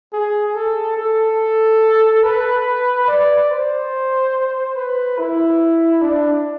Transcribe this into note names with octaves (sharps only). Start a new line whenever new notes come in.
G#4
A4
A4
B4
D5
C5
B4
E4
D4